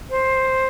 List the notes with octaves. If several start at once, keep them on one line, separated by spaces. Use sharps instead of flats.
C5